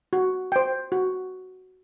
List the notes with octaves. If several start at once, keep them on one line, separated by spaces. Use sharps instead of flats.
F#4
C5 G5
F#4